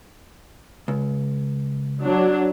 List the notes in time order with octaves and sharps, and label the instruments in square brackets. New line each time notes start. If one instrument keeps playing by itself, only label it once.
[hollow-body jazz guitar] C#2
[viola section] F#3 D4